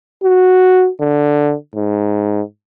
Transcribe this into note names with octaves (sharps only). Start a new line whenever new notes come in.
F#4
D3
G#2